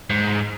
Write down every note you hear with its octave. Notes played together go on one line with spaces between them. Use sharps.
G#2